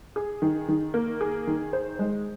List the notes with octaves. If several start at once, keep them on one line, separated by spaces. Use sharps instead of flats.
G#4
D#3
D#3
A#3
G#4
D#3
C5
G#3